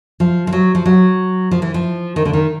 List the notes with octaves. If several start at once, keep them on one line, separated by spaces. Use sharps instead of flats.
F3
F3
F#3
F3
F#3
F3
E3
F3
D#3
D3
D#3